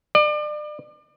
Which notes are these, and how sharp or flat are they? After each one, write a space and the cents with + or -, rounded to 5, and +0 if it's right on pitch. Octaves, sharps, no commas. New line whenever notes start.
D5 +35